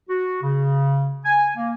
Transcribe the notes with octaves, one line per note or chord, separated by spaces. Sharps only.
F#4
C#3
G#5
A#3